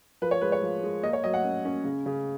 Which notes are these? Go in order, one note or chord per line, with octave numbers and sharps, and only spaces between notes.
F3 B4
C#5
G#3 B4
C#5
F3
G#3
A#3 D#5
C#5
F#3 D#5
F#5
C#4
C#4
C#3
C#3